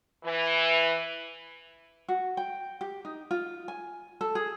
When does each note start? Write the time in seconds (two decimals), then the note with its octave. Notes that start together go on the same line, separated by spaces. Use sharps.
0.24 E3
2.08 F#4
2.37 G5
2.81 G4
3.05 D#4
3.31 F4
3.68 G#5
4.21 A4
4.35 G#4